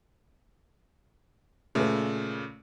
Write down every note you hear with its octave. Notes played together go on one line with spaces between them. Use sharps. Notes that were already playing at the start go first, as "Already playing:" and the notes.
A#2 C#3 A3 B4